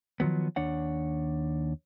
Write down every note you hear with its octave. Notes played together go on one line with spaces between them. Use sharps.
D#3 F3 F#3 B3
D#2 D4 C#5 F#5